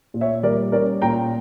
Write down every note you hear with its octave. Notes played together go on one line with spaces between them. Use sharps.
A#2
C#5 E5
G3 A#4 D5
C#4 A#4 D5
A#2 G5 A#5